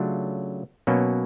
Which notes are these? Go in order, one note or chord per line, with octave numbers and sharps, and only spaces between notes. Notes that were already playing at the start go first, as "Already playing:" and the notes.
Already playing: C#3 F#3 A3 D4 F4
B2 F#3 A#3 C#4